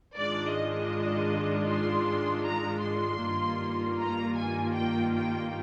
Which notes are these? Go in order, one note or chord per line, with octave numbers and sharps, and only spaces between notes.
G#2 D#3 G#3 D4 F4 D5
D#5
C6
A#5
C6
G2 D#3 A#3 F4
A#5
G#5
G5
G5